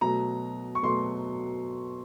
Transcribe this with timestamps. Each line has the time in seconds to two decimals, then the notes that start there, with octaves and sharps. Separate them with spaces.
0.01 B2 F#3 A3 A#5
0.75 C#6
0.83 B2 F#3 A3 C6